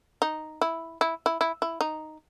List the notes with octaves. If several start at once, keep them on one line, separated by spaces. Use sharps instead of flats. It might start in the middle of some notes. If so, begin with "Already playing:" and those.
D#4
E4
E4
E4
E4
E4
D#4